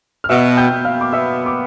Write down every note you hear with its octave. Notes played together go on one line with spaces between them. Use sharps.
F6
B2 E5 E6
G5 G6
B2
F5 F6
D6
B3 E5 E6
D6